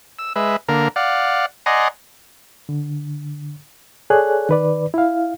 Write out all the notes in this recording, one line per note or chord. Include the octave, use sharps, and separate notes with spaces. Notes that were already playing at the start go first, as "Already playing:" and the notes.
E6
G#3 B4 E5
D3 A#3 A#4
D5 F5 F#5
D5 D#5 F#5 G#5 A#5 C6
D3
G#4 A4 C#5 D5 G#5 F#6
D#3 B4 D5
E4 F5